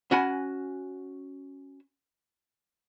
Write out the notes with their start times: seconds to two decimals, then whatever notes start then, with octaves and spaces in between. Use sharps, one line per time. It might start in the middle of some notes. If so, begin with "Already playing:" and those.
0.11 C#4 F#4 F#5 G#5 B5